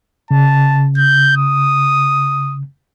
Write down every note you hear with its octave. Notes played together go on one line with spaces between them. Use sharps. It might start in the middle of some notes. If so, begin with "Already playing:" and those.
C#3 A5
G6
D#6